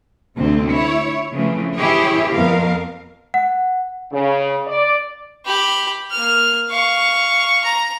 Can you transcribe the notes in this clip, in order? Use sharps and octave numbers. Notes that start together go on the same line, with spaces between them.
D2 C3 C4
E4 C#5
C#3 E3 F3 A3 C4
E3 E4 G4 G#4 C#5
F2 B3 A#4 F5
F#5
C#3
D5
G4 B5
A#3 F6
F5 C#6
A#5